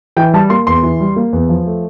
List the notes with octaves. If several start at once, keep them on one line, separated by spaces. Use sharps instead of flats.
E3 G5
G3 A5
A#3 C6
E2 C6
E3
G3
A#3
E2
F3
A3